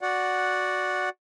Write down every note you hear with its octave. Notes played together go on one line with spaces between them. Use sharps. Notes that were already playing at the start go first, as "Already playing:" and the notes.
F#4 D5 F#5